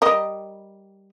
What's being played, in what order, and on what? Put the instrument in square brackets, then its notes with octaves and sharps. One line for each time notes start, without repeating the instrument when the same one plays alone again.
[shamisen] G3 A#4 D#5